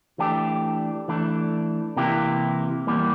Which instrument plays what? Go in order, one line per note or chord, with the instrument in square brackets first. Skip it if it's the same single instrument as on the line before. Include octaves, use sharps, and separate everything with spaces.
[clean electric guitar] E3 A3 D4 G4
E3 A3 D4
C3 E3 A#3 E4 G4
E2 E3 G3 A#3